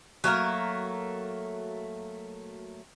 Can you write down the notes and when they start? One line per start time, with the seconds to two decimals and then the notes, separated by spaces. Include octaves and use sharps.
0.24 F#3 A3 A#3 A#4